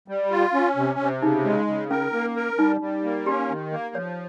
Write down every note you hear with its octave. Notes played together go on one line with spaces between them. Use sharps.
G3
F4
C#4
C3
C3
C#3 D#4
G#3
C#3
C#4 A#4
A#3
A#4
G3 D#4
G3
A#3
C#4 G4
D#3
A#3
F3 C#5